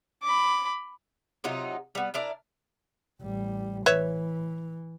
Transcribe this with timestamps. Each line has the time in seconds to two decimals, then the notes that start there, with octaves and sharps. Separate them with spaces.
0.23 B5 D6
1.44 C3 F#3 D#4 F4
1.95 G3 B3
2.14 D4 E4 A#4 D5
3.21 A1 G3
3.86 E3 B4 C#5 E5